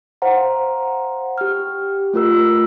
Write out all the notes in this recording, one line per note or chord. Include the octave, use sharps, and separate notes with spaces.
C5 F5 F#5 A#5
G4 F6
A3 F4 A#4 E6